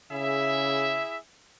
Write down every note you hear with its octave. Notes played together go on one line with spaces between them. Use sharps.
C#3 E4 G#4 E5